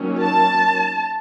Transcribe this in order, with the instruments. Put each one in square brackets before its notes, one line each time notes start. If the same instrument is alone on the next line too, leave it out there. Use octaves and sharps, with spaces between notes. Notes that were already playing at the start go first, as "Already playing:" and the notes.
Already playing: [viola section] D#3 F#3 A#3 C#4
A5